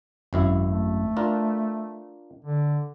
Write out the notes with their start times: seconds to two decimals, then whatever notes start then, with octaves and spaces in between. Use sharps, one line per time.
0.33 G#1 F#2 E4
0.65 A3
1.17 D4 F4 A#4
2.45 D3